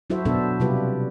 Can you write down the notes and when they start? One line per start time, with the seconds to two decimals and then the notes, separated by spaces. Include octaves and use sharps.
0.10 F#3 E4 F#4 A4 C5 E5
0.25 B2 B3 D4 A4 C5 E5
0.60 C3 G3 F4 G4 B4